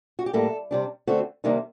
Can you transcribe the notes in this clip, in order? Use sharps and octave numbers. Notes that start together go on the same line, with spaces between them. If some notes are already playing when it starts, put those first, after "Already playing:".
F#4
G4
A2 G3 A#3 A4
C3 G3 D4
D3 A3 C4 F#4
C3 D#3 G3 A#3 D4 D#4